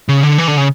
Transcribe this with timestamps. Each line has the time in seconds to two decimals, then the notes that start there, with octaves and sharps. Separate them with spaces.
0.09 C#3
0.23 D3
0.38 E3
0.48 D3
0.57 C#3